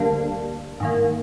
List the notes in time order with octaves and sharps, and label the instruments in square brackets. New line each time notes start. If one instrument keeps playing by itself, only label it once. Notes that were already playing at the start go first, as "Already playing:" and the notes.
Already playing: [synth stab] D2 D3 G3 A#3 D4
G#2 D#3 A#3